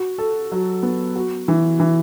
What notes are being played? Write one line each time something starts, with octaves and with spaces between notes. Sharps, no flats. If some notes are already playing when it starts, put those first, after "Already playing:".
Already playing: F#4
A4
F#3
B3
F#4
E3
E3